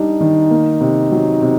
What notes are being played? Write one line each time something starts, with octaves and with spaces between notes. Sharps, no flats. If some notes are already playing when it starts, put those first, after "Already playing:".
Already playing: G3 D4 D#4
D#3
A#3
C3
F#3
C3